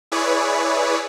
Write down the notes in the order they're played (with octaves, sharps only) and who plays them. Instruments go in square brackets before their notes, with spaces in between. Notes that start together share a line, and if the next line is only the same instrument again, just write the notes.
[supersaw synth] E4 G#4 B4 C#5 D5